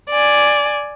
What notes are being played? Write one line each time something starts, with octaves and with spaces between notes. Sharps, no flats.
D5 G#5